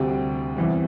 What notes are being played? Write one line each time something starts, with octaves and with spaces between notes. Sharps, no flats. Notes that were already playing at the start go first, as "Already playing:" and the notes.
Already playing: D2 C3 G3 G5
E2 C3 E3 G3